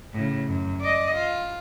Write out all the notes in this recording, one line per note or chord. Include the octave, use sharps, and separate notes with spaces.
A2 C#3
F#2
D5 D#5
F4